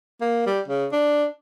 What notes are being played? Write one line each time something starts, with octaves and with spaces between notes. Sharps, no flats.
A#3
G3
C#3
D4